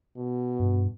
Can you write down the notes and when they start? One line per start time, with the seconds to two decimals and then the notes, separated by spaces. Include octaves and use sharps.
0.17 B2
0.60 G2